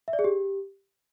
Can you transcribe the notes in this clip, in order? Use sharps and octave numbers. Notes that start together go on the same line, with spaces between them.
E5
D5
G#4
G4